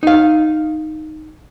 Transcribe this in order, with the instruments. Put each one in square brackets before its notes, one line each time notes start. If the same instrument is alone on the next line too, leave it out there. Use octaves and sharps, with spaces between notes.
[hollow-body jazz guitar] D#4 F5